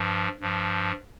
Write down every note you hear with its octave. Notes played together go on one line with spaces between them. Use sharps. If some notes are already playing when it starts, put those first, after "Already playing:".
Already playing: G2 F3
G2 F3